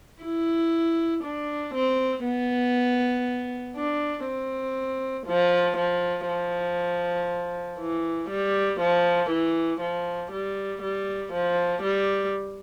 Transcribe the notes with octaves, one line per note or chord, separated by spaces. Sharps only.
E4
D4
C4
B3
D4
C4
F3
F3
F3
E3
G3
F3
E3
F3
G3
G3
F3
G3